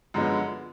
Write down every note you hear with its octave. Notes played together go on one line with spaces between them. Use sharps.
F#2 D3 F3 G#3 B3